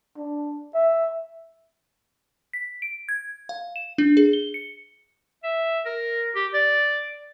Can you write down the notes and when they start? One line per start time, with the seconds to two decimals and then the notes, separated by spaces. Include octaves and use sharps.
0.17 D4
0.75 E5
2.53 B6
2.82 D7
3.09 G#6
3.49 F5
3.76 E7
3.98 D4
4.17 G#4
4.33 G7
4.54 C#7
5.44 E5
5.85 A#4
6.36 G4
6.54 D5